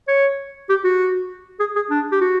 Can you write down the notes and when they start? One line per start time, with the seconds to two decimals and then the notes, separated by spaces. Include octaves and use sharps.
0.08 C#5
0.69 G4
0.84 F#4
1.60 G#4
1.76 G#4
1.91 D4
2.12 G4
2.21 F#4